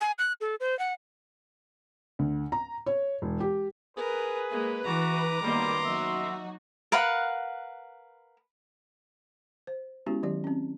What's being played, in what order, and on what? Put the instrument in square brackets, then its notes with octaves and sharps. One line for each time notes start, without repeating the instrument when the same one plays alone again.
[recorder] G#5
F#6
A4
C5
F#5
[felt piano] D2
A#5
C#5
E1
G4
[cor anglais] G#4 [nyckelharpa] A#4 [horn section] B4
[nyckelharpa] G#3 A#3
[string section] E3 [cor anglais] F#4 [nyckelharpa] A#5 D6
[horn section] F#2 C6 [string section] D#3 A#3 B3 [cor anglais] G3
[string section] F#3 D#4 F#4 [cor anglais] E5
[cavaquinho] A#4 B4 F5 F#5
[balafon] C5
G#3 B3 C#4 E4 F#4 G4
D#3 F#3 G4 D5
C4 C#4